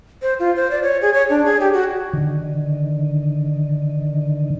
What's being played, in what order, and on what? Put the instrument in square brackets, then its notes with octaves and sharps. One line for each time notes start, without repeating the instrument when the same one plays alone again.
[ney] C5
F4
C5
D5
C#5
G#4
C#5
D4
G#4
G4
F#4
[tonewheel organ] D3 D#3